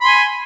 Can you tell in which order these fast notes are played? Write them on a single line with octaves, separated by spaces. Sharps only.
B5 C6 G#5